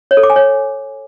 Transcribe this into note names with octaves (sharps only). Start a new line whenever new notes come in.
C#5
A4
D6
G#5
C#5